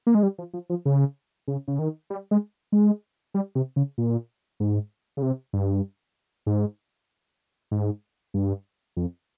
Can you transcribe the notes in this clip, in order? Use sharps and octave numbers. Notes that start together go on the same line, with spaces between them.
A#3
G#3
G3
F3
F3
F3
C#3
C#3
C#3
D#3
G3
G#3
G#3
G3
C3
C#3
A#2
G#2
C#3
C3
G2
G#2
G#2
G2
F2